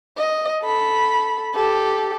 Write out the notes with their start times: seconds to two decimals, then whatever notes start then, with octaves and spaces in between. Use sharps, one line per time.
0.18 D#5
0.63 A4 B5
1.54 G4 A4